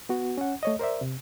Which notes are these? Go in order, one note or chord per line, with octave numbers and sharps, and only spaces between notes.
B3 F#4
C#4 F#5
A3 C#5 D#5
A#4 C5 D5 E5
C3